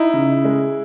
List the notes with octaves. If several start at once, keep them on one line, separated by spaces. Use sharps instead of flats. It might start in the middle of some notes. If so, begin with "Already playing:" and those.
Already playing: D#4 E4
C#3
G#3